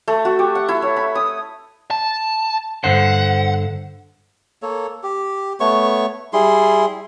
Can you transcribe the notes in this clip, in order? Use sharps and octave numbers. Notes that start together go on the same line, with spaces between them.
A3
F#4
G4
F#5
E4
C#5
B5
D#6
A5
G2 D3 C5 F#5
A#3 A4 C#5
G4
A3 B3 C#5 C#6
G3 E4 G#4 C6